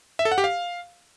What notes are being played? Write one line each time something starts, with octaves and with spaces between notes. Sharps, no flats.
E5
A4
F#5
G4
F5